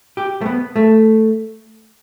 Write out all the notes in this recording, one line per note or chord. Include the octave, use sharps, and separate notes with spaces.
G4
A3
B3
A3